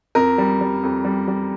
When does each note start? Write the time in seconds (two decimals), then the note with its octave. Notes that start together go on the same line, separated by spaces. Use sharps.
0.15 F2 A#4
0.38 G3
0.61 G3
0.83 F2
1.05 G3
1.28 G3